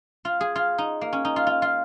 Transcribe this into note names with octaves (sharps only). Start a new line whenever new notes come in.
F4
G#4
F4
D#4
A#3
C#4
D#4
F4
F4
F4